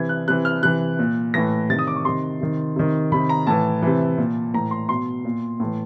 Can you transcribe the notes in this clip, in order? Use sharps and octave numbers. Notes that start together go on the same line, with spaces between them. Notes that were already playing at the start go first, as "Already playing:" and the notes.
Already playing: C3 E3 G#6
F#6
C3 E3 F#6
F6
C3 E3 F#6
A#2
A2 E3 A#6
C3 D#3 A6
D#6
D6
C#6
C3 D#3 C6
C3 D#3
C3 D#3
C3 D#3 B5
A#5
A2 E3 A5
C3 E3
A#2
A2 E3 A#5
C6
B2 C6
A#2
A2 E3